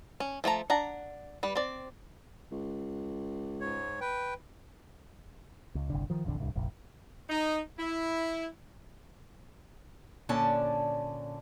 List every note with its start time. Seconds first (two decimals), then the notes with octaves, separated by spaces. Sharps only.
0.20 C#4
0.44 F3 A3 F#4 A#5
0.70 D4 F#5 A#5
1.43 G3 B4
1.56 C4 D5
2.52 C#2
3.60 G#2 C#5
4.01 B4 G5
5.75 C#2
5.90 G1 C2 D3
6.10 D#3 F3
6.25 E1 A1 F2 D3
6.38 D1 C2 G2
6.56 F1 A#1
7.29 D#4
7.79 E4
10.29 A#2 D3 C#4 D4 D5 A5